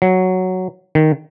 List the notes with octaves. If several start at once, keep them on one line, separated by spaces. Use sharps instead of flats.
F#3
D#3